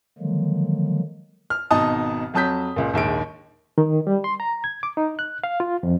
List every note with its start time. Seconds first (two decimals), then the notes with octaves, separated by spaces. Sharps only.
0.18 D3 D#3 F3 F#3 G#3 A#3
1.50 F6
1.71 G#1 B2 D#4 D#5 A5 D#6
2.34 F2 F#3 A5 D#6 G6 B6
2.76 C#2 A#2
2.94 A#1 D#2 G#2 D7
3.78 D#3
4.07 G3
4.24 C6
4.40 A#5
4.64 G#6
4.83 D6
4.97 D#4
5.19 F#6
5.44 F5
5.60 F4
5.83 F2